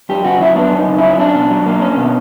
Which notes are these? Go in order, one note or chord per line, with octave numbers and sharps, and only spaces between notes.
F#2 G4
C#3 F#4
F#3 E4
B3 D4
F#2
D#4
C#3
E4
F#3
C#4 D4
B2
F#3
A#3
C#4
B2